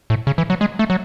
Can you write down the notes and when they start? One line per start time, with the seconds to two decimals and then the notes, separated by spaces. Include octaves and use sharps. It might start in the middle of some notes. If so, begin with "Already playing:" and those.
0.10 A2
0.27 C#3
0.38 E3
0.50 F#3
0.61 G#3
0.79 A3
0.90 F#3